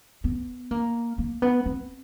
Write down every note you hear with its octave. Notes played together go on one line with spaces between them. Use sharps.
B3
A#3
A#3
B3
C4